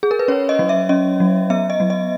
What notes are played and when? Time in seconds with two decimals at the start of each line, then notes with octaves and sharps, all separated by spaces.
0.03 G#4
0.11 A#4
0.19 B4
0.28 C#4 C#5
0.49 D#5
0.59 F#3
0.69 E5
0.89 C#4 D#5
1.20 F#3
1.50 B3 E5
1.70 D#5
1.80 F#3
1.90 D#5